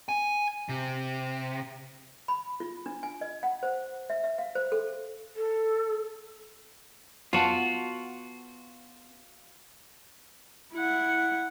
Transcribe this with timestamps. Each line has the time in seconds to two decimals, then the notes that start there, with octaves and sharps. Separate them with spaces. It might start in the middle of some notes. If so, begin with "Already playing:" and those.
0.09 G#5
0.69 C3
2.28 B5
2.60 F4
2.86 D4
3.03 G#5
3.21 D#5
3.43 F#5
3.63 C5
4.10 E5
4.24 E5
4.38 F5
4.55 C5
4.72 A4
5.36 A4
7.33 B3 F4 F#4 A5
10.74 E4 F#5